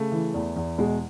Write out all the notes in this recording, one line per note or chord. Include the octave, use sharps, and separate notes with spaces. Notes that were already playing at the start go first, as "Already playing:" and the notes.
Already playing: C#3 A3
E3
E2
E2
B2 G#3